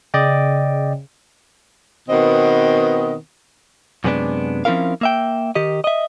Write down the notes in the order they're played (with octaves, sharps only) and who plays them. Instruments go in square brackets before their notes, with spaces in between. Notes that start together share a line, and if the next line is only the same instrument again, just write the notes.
[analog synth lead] C#3 [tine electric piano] D5 D#5 G5
[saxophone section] B2 D#3 B3 C4 D#5
[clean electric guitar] F#2 C3 G#3 B3 D4
F3 C4 C#4 E4 A#4 F5
A#3 E5 G5
D#3 G4 D#5
D#5 E5